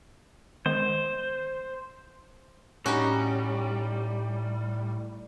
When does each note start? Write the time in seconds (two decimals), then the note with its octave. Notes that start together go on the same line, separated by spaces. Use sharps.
0.66 D#3 G#3 B3 C5
2.86 A2 G3 C#4 D#4 F#4